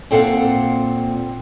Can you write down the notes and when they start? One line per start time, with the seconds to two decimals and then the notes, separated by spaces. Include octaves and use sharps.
0.11 A#2 C4 A4 F5 F#5